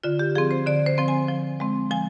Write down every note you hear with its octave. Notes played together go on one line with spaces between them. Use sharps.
D3 F4
G4
F3 C4 G#4
C5
D3 D5
C5
F3 C4
G#5
F3
G#3 C4
F3 G#5